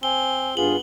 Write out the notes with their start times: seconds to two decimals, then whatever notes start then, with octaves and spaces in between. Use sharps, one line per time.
0.03 C4 G#5 G7
0.57 G2 B3 F4 G#4 F#7